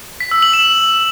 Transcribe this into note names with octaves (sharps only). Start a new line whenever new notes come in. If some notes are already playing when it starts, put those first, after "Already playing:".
B6
E6
F#7
E7